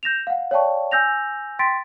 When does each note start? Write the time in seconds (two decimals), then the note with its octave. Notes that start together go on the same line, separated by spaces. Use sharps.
0.03 G6 A#6 E7 F7
0.27 F5 F#5
0.51 C#5 D5 F5 G5 A5 C#6
0.91 G#5 E6 G6 A#6 F7
1.59 G5 C6 A6 B6 D7